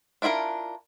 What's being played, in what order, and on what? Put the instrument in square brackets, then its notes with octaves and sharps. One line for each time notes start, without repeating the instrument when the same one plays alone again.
[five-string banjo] D4 E4 F4 G#4 A#4